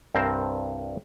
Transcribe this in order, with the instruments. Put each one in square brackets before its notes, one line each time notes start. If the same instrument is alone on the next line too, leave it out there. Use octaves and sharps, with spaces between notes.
[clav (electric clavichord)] C2 G2 C4 A#4 C5 A5